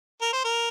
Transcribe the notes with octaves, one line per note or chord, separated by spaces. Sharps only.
A#4
C5
A#4